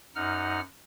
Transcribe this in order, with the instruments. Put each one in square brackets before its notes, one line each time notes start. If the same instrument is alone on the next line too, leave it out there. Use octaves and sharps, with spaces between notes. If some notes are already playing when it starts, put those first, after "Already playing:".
[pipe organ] F#2 D#4 F#5 F6